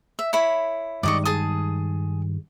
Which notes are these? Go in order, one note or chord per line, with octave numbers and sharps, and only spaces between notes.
E5
E4 C#5 B5
G2 D#3 G#3 D5 D#5 C#6
G#4 A5 D#6